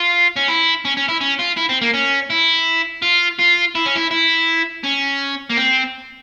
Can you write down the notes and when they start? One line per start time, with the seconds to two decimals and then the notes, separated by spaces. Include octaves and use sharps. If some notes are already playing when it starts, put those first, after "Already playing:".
Already playing: F4
0.36 C#4
0.48 E4
0.85 C#4
0.97 C#4
1.08 E4
1.21 C#4
1.39 F4
1.57 E4
1.69 C4
1.81 A#3
1.94 C#4
2.30 E4
3.02 F4
3.39 F4
3.75 E4
3.86 C#4
3.95 E4
4.11 E4
4.84 C#4
5.50 A#3
5.57 C4